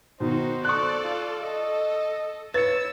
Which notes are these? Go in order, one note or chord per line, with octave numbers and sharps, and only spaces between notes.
B2 D#3 D#4 F#4 C5
A4 D5 C#6 F#6
F4
A4 D#5
E4 B4 C#5 E6 A6 C#7